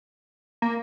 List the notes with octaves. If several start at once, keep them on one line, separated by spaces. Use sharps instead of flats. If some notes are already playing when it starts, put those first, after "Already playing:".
A#3